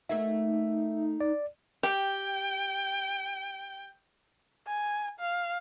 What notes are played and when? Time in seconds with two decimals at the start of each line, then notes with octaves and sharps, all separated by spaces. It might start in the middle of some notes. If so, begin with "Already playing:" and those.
0.09 A3 A#3 D#4 F#4 E5
1.20 D5
1.83 G4 G5
4.67 G#5
5.20 F5